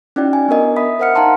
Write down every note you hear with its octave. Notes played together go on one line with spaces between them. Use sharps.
C#4 D#4 E4 F#4 D5 G5
G#5
B3 D4 A#4 D#5
E5 B5 D#6 B6
A#4 C5 F#5 F6 C#7
D#4 F5 F#5 A5 A#5 C6